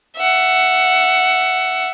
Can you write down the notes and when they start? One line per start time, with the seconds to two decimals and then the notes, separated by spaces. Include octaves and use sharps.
0.17 E5 F#5